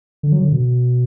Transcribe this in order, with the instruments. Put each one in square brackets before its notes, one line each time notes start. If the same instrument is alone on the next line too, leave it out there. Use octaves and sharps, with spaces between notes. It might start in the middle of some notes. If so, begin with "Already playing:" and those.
[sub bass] D3
F#3
D3
B2